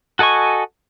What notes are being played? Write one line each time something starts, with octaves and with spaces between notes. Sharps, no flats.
F#4 A4 D#5 G#5 C#6